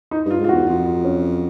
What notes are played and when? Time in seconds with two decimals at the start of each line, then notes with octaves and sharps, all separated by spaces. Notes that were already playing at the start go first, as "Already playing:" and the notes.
0.11 D#4
0.25 G2
0.30 F4
0.39 G#2
0.44 F4
0.49 F#4
0.53 E2
0.67 F2 F4
0.86 F4
1.05 C#4